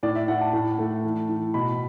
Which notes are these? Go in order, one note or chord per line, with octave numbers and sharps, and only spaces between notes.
A2 D5
E5
A2 F#5
A5
A2
A3
E3
E3
B2 B5